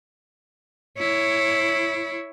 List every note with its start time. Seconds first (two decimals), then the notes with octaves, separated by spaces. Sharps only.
0.98 E4 C#5